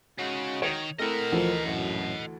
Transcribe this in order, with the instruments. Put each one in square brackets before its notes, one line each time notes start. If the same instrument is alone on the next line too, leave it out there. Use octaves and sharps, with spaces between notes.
[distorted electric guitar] C#3 [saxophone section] G#3 D#4 F#4
[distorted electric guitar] D#3 [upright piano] C#5 F7
[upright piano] A3 C4 E4 [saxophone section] A#4 [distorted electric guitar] D#5 F#5
[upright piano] D2 E3 A4 [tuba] F3
[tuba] F#2 [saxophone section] A2